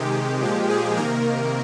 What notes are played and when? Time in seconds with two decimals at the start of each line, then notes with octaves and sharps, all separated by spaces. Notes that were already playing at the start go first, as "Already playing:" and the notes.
Already playing: C3 D#3 G#3 G4
0.41 A#2 F3 G#3
0.70 G#4
0.97 C3 D#3 A#3 A#4